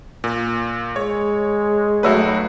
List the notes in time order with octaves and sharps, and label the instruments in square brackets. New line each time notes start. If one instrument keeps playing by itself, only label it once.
[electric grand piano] A#2
[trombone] G#3 [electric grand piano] C#5
[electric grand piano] B1 F#4 B4 [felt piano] A3 C#5 E6